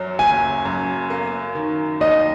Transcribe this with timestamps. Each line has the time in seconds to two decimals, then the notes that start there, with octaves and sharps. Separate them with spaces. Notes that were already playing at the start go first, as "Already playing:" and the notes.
Already playing: F#2 F#3
0.19 F#1 G#5
0.65 F#2
1.10 A#3
1.55 D#3
2.01 D#2 D#5